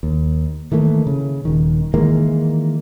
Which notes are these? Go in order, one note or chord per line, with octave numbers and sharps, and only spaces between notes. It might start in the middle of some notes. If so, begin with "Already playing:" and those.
D#2
D#3 E3 A3 A#3
C#3
D#1 D#3
D#3 E3 G#3 A#3